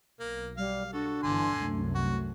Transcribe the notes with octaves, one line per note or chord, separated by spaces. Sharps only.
B1 A#3
G3 F5
D4 F#4 A4
G1 D3 E3 G#5 C6
C2 F#2 A3
F#4